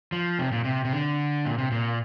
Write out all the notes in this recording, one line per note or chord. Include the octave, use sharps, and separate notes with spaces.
F3
C3
A#2
C3
C3
D3
A#2
C3
A#2